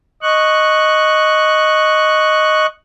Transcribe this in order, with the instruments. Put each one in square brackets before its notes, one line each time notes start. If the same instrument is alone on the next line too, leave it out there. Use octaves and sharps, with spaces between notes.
[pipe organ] D#5 C#6 F#6